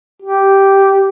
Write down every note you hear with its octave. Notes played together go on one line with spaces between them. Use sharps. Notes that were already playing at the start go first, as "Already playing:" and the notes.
G4